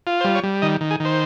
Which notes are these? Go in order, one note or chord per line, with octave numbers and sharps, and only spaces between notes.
F4
C5
G3
C#5
G3
D#3 D#5
D#3
G#4
D#3 C5